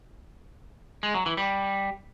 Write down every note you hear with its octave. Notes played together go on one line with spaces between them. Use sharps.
G#3
F#3
E3
G3